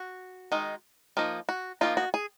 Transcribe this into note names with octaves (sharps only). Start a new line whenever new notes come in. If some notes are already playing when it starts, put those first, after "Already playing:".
Already playing: F#4
D#3 G#3 D#4
F3 A#3 D#4
F#4
F3 A#3 D#4 F4
F#4
G#4